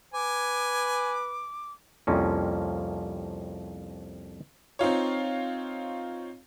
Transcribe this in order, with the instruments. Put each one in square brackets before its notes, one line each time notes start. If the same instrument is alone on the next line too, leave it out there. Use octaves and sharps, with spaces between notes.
[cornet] B4 [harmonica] G#5 [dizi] D6
[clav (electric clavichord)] C2 F2 F3 A#3 C#4
[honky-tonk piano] C4 D#4 F4 C#5